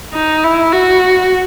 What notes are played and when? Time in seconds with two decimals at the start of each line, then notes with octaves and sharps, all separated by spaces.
0.14 D#4
0.44 E4
0.72 F#4